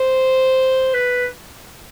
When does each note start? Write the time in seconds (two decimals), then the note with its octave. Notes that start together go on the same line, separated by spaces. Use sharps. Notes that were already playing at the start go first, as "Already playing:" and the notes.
Already playing: C5
0.94 B4